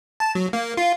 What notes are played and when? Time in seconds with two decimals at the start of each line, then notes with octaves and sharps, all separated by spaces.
0.20 A5
0.35 F#3
0.53 A#3
0.77 F4